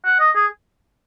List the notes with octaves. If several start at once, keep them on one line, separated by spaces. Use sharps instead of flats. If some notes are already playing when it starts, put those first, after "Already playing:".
F#5
D#5
G#4